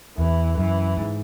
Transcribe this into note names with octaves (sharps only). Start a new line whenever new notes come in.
E2 E3
F#2 E3
G#2